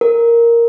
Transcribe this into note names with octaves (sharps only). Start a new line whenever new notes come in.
A#4